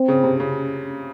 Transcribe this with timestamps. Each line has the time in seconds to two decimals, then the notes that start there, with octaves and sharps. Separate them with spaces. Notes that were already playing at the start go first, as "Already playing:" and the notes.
Already playing: C4
0.08 C#3
0.24 C3
0.40 C#3